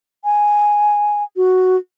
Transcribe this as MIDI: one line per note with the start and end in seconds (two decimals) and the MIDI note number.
0.25 1.23 80
1.36 1.76 66